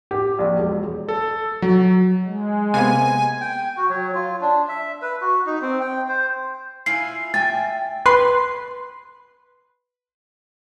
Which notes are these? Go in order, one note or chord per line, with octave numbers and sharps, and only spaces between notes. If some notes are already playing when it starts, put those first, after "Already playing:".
G4
A#1
E1
A4
F#3
G#3
C3 A#3 B3 G#5
G5
F#4
F#3
F4
D4
E5
B4
F#4
D#4
C4
G5
C5
E4 F4 G#5 C7
E5 G5 G#5 A6
B4 C6